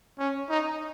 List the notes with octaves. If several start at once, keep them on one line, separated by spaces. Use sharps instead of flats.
C#4
D#4